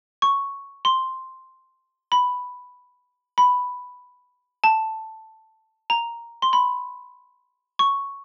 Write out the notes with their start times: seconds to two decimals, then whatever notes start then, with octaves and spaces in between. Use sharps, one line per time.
0.22 C#6
0.85 C6
2.12 B5
3.38 B5
4.64 A5
5.90 A#5
6.42 C6
6.53 B5
7.79 C#6